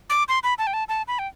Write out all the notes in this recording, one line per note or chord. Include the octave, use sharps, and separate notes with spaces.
D6
C6
B5
A5
G5
A5
A5
B5
G5